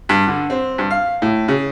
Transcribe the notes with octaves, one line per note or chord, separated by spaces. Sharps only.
G2
D3
C4
G2
F5
A2
C#3